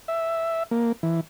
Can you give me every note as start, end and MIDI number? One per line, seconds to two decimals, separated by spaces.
0.08 0.63 76
0.71 0.92 58
1.03 1.21 52